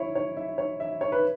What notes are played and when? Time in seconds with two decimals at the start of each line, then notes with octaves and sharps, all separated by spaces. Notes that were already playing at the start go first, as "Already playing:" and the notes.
Already playing: E4 C#5
0.15 C#5
0.37 E5
0.58 C#5
0.80 E5
1.01 C#5
1.12 B4